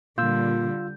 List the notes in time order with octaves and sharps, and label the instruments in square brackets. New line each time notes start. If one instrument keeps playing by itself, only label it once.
[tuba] A#2 [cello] D3 G3 [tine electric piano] F4 E6 [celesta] G6